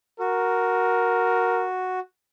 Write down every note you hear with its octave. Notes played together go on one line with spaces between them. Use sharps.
F#4 A#4